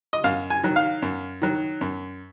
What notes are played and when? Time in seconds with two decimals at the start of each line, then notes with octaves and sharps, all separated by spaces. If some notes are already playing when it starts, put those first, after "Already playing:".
0.13 D#5
0.24 F#2 F5
0.50 G#5
0.63 D#3 F#3
0.76 F5
1.02 F#2
1.42 D#3 F#3
1.81 F#2